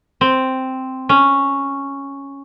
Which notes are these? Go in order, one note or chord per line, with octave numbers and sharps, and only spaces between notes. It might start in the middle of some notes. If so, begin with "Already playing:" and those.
C4
C#4